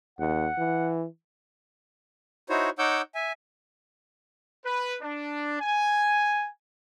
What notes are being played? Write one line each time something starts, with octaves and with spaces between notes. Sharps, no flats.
D#2 F#5
E3
D#4 E4 F#4 C5 C#5
D#4 C#5 F#5 D6 E6 G6
E5 G#5
B4
D4
G#5